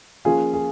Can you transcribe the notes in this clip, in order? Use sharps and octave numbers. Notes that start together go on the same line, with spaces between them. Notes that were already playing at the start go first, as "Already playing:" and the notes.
F3 A#3 C#4 F4 G#4
G#4